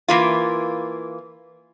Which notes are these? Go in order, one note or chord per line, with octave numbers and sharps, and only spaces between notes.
E3 A#3 F4